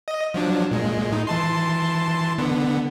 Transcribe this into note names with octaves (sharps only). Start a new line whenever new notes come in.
D#5
F3 F#3 D4
A#2 G#3
A2 D#4
E3 A5 C6
D3 B3